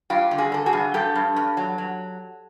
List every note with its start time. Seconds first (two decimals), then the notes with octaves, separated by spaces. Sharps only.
0.10 G2 F4 G4
0.31 D3
0.38 F#4 G#4
0.52 D3 A4
0.66 F#4 G#4
0.73 G2
0.94 G2 G4 A4
1.15 G2
1.36 G2
1.57 F#3
1.78 F#3